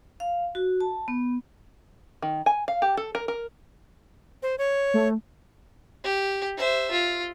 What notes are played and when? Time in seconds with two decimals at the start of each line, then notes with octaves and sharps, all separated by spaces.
0.20 F5
0.55 F#4
0.81 A5
1.08 B3
2.22 D#3
2.46 G#5
2.68 F5
2.82 G4
2.97 A4
3.15 A#4
3.28 A#4
4.43 C5
4.58 C#5
4.94 A3
6.04 G4
6.57 C5 E5
6.91 F4